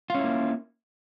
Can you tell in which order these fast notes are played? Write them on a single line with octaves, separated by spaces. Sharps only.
F4 C#4 E4 A#3